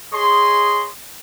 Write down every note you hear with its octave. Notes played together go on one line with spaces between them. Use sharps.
G#4 C#5 D#5 C6